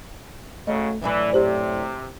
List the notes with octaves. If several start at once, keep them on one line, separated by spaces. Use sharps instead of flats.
C#3 F#3 A3 D#5
F#2 A2 E3 D4 B4
C3 E4 G4 C5